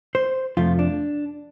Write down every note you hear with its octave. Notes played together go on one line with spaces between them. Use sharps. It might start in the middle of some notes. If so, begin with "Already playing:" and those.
C5
F2 C3 F3 A3 F4
D4